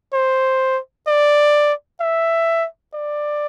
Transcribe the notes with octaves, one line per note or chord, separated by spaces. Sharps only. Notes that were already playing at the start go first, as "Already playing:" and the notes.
C5
D5
E5
D5